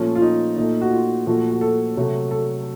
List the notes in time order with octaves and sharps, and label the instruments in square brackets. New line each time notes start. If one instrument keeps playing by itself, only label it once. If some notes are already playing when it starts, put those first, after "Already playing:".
Already playing: [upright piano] A#2 F3 A3 C#4
F4
D#4
A#2 F3 A3 D#4
F#4
F4
A#2 F3 A3 F#4
F#4
A4
C3 F#3 A3
A4